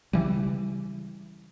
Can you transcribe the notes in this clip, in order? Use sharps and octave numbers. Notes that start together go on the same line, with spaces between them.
C#3 E3 G3